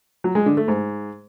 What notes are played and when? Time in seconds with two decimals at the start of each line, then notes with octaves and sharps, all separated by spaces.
0.24 F#3
0.35 G#3
0.46 D3
0.57 A3
0.68 G#2